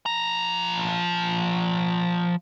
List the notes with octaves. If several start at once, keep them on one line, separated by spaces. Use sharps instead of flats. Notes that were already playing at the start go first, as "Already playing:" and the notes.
F3 A#5